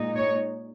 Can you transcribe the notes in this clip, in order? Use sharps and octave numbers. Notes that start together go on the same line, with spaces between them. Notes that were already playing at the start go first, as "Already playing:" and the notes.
Already playing: A#2 G#3 D#4
C#5